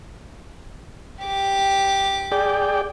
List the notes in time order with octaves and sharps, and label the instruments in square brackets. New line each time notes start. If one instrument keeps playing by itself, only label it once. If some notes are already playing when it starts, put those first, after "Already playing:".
[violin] G4 D6
[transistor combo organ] G#4 D5 G5